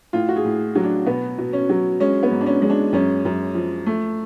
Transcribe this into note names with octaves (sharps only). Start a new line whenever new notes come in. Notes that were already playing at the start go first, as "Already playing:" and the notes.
A2 F4
F#4
G#4
A2
F#3
D4
B2 B3
B2
C#4
F#3
G#3 C#4
B3
G#2
D4
C#4
G#3
D4
F#2 C#4
F#2
F3
A3